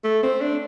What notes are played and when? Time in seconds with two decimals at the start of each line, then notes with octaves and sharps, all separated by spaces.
0.04 A3
0.23 C4
0.41 D4